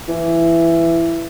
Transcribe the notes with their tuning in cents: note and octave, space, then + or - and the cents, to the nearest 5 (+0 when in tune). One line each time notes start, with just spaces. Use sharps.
E3 +15